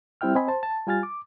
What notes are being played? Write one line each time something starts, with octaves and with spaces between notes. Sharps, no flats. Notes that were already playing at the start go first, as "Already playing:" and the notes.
G3 C4 E4 E5 G5 F6
C4 D#5 G#5 B5
C5 A5
A5
G3 F4 G#5 F6 A6
D6